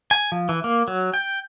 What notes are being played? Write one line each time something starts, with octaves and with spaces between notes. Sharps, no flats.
G#5
F3
E3
A#3
F#3
G5